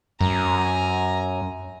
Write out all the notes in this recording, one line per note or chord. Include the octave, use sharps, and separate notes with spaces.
F#2 G#5 A#5